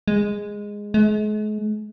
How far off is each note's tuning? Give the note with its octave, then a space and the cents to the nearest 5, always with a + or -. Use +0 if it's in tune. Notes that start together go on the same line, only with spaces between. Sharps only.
G#3 -10
G#3 +40